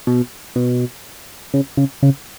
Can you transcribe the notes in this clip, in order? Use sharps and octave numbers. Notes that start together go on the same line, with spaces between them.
B2
B2
C#3
C#3
C#3